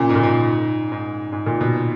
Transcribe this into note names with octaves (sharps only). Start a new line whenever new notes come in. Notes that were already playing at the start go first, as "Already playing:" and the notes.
Already playing: A#2 C#3
G#2
A#2
G#2
G#2
G#2
A#2
B2